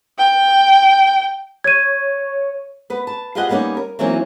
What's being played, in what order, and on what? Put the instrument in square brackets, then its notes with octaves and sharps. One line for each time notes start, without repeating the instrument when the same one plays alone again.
[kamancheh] G5
[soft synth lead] C#5 [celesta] G#6 D#7
[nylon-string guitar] B3 B4
A5
F4 G4 G#4 C5 D#5 F#5
G3 A#3 B3 C#4 D#4
A#4
E3 F#3 A#3 C4 C#4 D#4